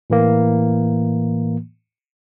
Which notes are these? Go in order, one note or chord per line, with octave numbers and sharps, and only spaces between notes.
A2 E3 A#3